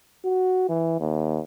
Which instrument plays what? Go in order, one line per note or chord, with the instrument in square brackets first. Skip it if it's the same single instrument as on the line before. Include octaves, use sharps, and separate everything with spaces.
[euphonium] F#4
E3
D#2